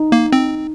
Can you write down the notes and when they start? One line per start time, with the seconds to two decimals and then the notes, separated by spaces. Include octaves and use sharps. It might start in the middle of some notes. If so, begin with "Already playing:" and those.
Already playing: D#4
0.12 A#3
0.33 C4